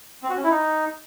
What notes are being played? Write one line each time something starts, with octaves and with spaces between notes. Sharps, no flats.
C4
F#4
C#4
E4
D#4